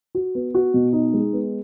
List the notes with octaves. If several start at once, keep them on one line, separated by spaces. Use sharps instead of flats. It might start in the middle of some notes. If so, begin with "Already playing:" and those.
F#4
B3
F#4
B2
D#4
G#3
B3